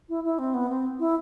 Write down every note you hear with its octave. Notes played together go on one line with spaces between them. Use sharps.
E4
E4
C4
B3
C4
E4